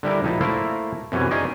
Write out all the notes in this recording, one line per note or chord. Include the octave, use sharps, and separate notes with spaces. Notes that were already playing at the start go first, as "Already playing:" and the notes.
D3 G3 E4 A#4
A#1 D#4 E4 A5
A3 A#3 E4 A#4 C5 E5
F#2 C3 E3 B3 C#4 G#5
C#4 D#4 G#4 D5 D#5